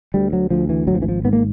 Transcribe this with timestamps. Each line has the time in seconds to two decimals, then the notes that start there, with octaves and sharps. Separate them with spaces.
0.14 D2 G3
0.33 F#3
0.50 D2 F3
0.69 E3
0.87 G#1 F#3
0.94 F3
1.02 E3
1.09 F3
1.24 G#2 B3
1.33 A#3